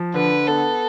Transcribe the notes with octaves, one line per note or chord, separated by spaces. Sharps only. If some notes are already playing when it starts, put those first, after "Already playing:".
Already playing: F3
D3 B4
B3 A4